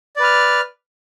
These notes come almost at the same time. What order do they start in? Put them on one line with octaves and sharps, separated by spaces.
D5 B4 F6